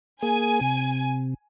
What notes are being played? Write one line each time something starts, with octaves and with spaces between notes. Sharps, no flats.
A#3 G#4 G#5
C3